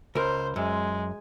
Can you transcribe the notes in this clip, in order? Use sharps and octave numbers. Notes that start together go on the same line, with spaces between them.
C#2 A#4 C5
F#2 G#3